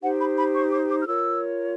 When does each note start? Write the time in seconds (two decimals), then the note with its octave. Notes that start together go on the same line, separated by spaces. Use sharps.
0.01 D#4 G4 C5 F#5
0.19 B5
0.37 B5
0.54 C#6
0.71 D6
0.90 D6
1.02 F6
1.06 F4 A#4 C#5 E6